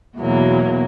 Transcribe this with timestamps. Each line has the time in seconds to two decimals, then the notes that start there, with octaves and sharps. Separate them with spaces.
0.18 E2 B2 F#3 A#3